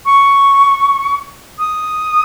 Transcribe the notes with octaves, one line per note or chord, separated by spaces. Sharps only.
C#6
D#6